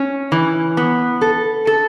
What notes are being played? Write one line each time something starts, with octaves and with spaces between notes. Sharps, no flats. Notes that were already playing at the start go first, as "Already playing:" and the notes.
Already playing: C#4
E3
B3
A4
A4